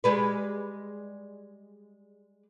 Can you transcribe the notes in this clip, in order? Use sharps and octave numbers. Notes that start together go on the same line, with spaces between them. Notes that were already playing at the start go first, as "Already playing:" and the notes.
G3 G#3 B4